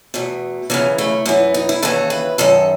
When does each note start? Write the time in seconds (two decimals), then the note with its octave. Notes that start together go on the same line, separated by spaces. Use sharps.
0.14 E2 B2 A3
0.70 F#2 C#3 E3 B3
0.98 A3
1.25 F#2 E3 B3
1.54 D#4
1.69 E4
1.82 D#2 C#3 E3 A4
2.10 B4
2.38 F#2 D#3 A4